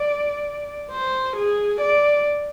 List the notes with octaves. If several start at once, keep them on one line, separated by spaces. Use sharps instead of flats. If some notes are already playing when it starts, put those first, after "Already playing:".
Already playing: D5
C5
G#4
D5